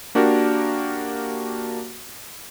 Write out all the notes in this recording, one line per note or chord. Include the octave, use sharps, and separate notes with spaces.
A#3 D4 F#4 G4 A#4